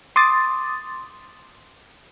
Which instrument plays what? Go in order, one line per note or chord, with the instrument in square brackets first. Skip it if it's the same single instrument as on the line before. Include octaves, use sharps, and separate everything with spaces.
[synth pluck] C6 D6 D#6 A6